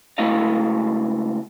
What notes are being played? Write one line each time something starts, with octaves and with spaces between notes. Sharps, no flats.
C#2 A3 E4 F#4 D#5 F5